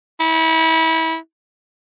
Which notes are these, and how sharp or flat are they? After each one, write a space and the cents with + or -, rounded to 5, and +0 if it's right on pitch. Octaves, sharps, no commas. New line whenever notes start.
E4 -30